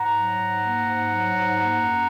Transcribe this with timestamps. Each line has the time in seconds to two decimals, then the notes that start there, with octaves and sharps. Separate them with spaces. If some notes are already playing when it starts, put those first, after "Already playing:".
Already playing: G#2 F#5 A#5
0.14 F#3
0.38 G#2
0.61 A#3
0.85 G#2
1.09 F#3
1.33 G#2
1.57 A#3
1.80 F#2